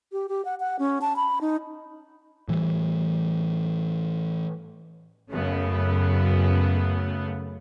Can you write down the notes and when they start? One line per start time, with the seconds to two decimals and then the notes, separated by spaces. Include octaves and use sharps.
0.12 G4
0.29 G4
0.45 F#5
0.60 F#5
0.79 C#4
1.01 A5
1.16 B5
1.41 D#4
2.48 A2 E3 G3
5.30 F#2 C#3 A3 B3